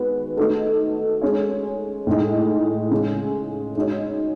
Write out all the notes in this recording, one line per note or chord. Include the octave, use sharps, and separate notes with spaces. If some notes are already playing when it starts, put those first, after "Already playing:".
Already playing: D#3 G#3 B3 F#4 B4
A3 D#4 F#4 A4
G#3 C#4 G#4 C#5
A2 G#3 D#4
C#3 G#3 C#4 G#4
G#3 D#4 F#4 C#5